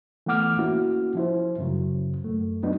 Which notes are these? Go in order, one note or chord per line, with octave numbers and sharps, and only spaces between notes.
E3 A3 B3 F#5 D6 F6
A#3 C#4 E4 F#4
F3 E4 C5
F#2 C#3 F#3
F#2 A3
F#3 B3 D4 D#4